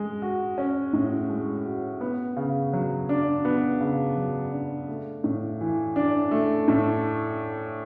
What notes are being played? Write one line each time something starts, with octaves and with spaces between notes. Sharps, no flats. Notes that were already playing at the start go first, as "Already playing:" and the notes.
Already playing: G#3
F#4
C#4
A2
G#3
F#4
B3
C#3
F#3
D4
B3
C#3
F#3
D4
A3
A2
E3
D4
A3
A2